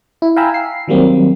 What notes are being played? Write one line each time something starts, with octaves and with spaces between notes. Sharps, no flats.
E4
F5 G5 G#5 A#5 B5 E6
C7
D#3 F#3 G3 A#3 C4